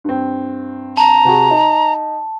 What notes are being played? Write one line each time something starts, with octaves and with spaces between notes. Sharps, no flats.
G2 C4
A5 A#5
C3 F#4 G#4
D#4